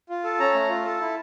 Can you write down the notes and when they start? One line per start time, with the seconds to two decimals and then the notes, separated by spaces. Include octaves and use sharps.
0.09 F4
0.24 A4
0.40 C#4 A#5
0.54 A3
0.69 F4
0.85 A4
1.01 E4